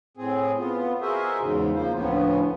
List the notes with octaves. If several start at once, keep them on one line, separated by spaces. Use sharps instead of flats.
A2 C4 G#4
B3 F4
F#4 G#4 A#4 C5 D#5 E5
E2 G#2 C#3
F3 A#3 C5
D2 A2 F3 B3 C#4